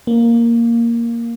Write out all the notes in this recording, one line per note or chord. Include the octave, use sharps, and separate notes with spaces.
A#3